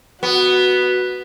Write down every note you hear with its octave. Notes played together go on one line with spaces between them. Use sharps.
B3 F#4